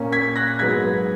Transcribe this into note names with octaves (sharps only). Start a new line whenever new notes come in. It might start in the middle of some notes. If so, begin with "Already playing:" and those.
Already playing: A#2 A#3 C#4
G#6 B6
F#6 A#6
G#2 F#3 B3 G#6 B6